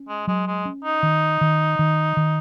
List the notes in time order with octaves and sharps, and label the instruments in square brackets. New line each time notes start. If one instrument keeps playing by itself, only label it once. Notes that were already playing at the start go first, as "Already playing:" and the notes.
Already playing: [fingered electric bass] C#4
[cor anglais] G#3
[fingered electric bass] F#3 [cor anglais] G#3
[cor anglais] G#3
[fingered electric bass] C#4
[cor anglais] D#4
[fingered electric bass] D#3
D#3
D#3
D#3